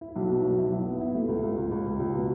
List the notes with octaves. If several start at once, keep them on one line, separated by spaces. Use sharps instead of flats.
E4
B1
B2
B1
E4
B1
B3
E4
A3
C#2
C#2
C#2
C#2
C#2
C#2
B2